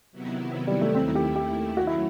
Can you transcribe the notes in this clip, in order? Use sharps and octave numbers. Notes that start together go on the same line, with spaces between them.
C3 D#3 F#3 B3 E4
G3
A3
D#2 D#3 A3 C4 E4
G4
G4
F#2 F#3 A3 F#4
E4